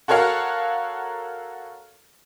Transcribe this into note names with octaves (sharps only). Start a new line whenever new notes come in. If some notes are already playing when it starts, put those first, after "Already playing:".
F#4 A4 A#4 C#5 F5 F#5